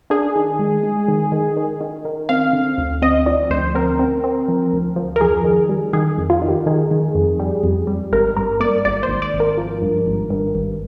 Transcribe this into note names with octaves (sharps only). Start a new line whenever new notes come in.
D4 G#4
D#3
G#3
G#3
D#3
D#3
D#3
D#3
D#3
C4 F5
D3
D2
C4 D#5
F3 D5
D2 C5
C4 A#4
C4
C4
F3
D2
F3
A#4
F2 G#4
D#3
G3
D#3 G#4
F2
F4
D#3
G4
D#3 G#4
D#3
F2
G3
F2
G3
G#1 A#4
G2 A#4
A#3 D5
G#1 D5
C5
G#1
D5
G#1
A#4
F3
G2
G#1
G2
G#1